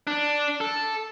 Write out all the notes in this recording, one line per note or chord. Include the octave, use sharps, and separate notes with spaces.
D4
A4